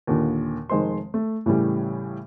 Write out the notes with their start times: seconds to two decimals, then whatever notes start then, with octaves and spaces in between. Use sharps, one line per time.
0.07 D#2 A#2 D3
0.69 F1 D#3 G#3 C5 C6
1.14 A3
1.46 A2 C#3 E3 G3 A3